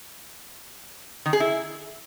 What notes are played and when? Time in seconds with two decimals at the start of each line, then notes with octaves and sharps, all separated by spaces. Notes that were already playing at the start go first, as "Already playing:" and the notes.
1.26 D#3
1.33 G#4
1.40 E4